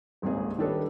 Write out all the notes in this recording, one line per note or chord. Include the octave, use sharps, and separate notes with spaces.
D#1 G#1 C#2 C4 C#4 G#4
D#3 G3 D4 A4 B4 C#5